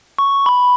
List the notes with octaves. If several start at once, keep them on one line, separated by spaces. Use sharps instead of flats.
C#6
B5